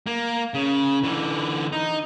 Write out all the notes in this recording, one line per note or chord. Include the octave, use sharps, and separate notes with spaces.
A#3
C#3
D3 E3
D#4